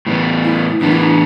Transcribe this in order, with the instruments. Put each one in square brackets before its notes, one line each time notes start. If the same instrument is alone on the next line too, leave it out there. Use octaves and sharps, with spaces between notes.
[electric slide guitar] A2 E3 B3
[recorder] E4
[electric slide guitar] A2 E3 B3 [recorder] D4
[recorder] E4
D4